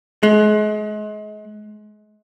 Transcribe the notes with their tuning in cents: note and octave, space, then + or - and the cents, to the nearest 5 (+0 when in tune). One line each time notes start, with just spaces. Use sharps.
G#3 +35